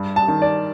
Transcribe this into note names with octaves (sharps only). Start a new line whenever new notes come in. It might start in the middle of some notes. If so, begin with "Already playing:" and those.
Already playing: G2
A5
D#3
D5